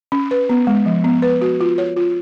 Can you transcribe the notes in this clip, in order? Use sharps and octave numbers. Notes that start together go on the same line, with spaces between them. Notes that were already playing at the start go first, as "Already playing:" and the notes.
C#4
B4
B3
G#3
F3
B3
B4
F#4
F4
C#5
F4